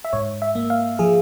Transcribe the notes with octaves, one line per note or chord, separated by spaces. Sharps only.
E5
G#2 C#5
E5
A#3
F5
F3 G#4